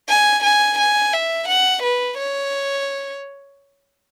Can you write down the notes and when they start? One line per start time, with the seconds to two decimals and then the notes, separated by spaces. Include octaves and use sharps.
0.09 G#5
0.44 G#5
0.79 G#5
1.13 E5
1.48 F#5
1.83 B4
2.18 C#5